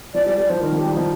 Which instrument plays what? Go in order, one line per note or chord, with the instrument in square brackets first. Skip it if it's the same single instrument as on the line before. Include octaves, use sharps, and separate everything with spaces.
[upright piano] F3 [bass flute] D5
[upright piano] G3 [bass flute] D5
[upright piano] G3 [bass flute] D5
[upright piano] F3 [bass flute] C5
[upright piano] D#3 [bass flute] A#4
[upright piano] F3 [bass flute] G4
[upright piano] G3
[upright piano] F3 [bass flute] D#4